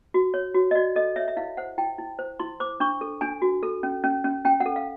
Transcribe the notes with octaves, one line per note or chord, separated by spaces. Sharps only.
F#4
C#5
F#4
D#5
F#4 D5
A4 D#5
C#5 E5
E5
E4 F5
C5 F#5
E4 G5
E4
C5
E4 C6
C5 D6
D4 C#6
A4
D4 G#5
F#4
A4
C#4
C#4
C#4
C#4 G5
F#5
A4
F5